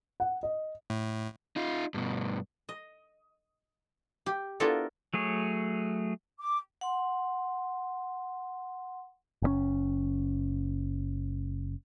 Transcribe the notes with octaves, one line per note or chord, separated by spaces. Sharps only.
F#5
D#5
A2
D#4 F4
G2 B2
D#5
G4
B3 D4 E4 F4 A4 A#4
F#3 A3 G#4 C#5
D6
F#5 C6
F#1 C#3 C#4